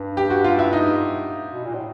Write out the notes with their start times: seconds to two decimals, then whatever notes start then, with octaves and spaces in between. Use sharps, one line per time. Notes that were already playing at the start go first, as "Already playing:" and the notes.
Already playing: G2
0.17 G4
0.30 F#4
0.44 F4
0.59 E4
0.73 D#4
1.53 B2
1.64 A#2
1.75 A2